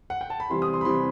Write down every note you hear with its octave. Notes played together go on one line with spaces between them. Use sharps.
F#5
G5
A5
B5
C3 E3 G3 C6
D#6
C6
B5
C3 E3 G3 C6